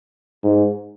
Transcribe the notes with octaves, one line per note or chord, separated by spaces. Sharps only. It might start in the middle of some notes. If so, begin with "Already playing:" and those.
G#2